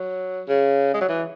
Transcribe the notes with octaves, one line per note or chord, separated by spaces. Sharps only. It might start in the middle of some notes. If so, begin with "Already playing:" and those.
Already playing: F#3
C#3
G#3
F#3
E3